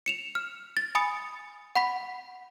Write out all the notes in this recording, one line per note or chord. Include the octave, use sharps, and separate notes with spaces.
C#7 E7 F7
F6
A6
G#5 B5 D#6 A6 C#7
F#5 B5 B6